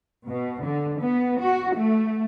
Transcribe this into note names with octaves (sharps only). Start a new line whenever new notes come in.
B2
D3
B3
F#4
A3